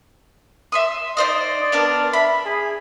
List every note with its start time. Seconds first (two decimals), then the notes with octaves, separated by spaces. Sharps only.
0.72 E5 C6 D#6
1.17 D#4 C5 D5 D#5
1.72 B3 D4 A#4
2.13 E5 B5
2.46 G#4